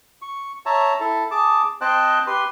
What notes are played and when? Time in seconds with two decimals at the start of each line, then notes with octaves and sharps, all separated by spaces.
0.22 C#6
0.66 C#5 E5 A5 A#5
1.00 E4 A4
1.31 G#4 A5 D6
1.81 C4 C5 D#5 G5 A5 F#6
2.27 G4 B4 C6